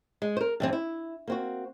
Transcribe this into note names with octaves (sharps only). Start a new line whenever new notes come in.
G#3
A#4 C5
G2 E3 C4
E4
A#3 C4 F#4